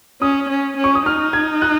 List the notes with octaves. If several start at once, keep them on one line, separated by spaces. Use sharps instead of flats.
C#4 D#6
C#4
C#4
C#6
D#6
D#4 F6
G#6
F#6